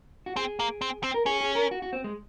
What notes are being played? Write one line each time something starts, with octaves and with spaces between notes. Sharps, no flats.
F#4
C4 G#4
A#3
C4
C4
A#4
C#4 G#4
G#4
A#4
F#4
F#4
C4
G#3